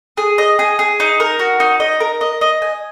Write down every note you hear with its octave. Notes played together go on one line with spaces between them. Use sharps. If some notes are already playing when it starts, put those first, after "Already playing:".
G#4
D#5
G#4
G#4
D#4
A#4
F#4
D#4
D#5
A#4
D#5
D#5
G#5